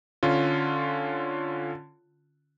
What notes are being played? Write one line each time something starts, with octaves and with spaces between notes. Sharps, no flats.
D3 C#4 F4